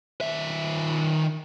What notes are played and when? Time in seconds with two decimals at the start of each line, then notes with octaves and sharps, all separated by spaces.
0.21 D#3 E5